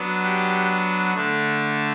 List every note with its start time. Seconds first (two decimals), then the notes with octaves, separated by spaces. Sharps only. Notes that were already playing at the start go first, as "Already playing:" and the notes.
Already playing: F#3 B3 D4
0.22 G4
1.14 D3 A3 D4